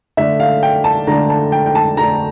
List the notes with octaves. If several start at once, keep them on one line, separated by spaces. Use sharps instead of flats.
D3 A3 D4 E5
F5
G5
A5
D3 A3 D4 A#5
A5
G5
G5
A5
D3 A3 D4 A#5